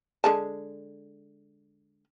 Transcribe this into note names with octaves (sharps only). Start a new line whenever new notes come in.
D3 G#3 A5